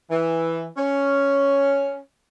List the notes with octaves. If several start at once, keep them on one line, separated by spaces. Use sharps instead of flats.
E3
C#4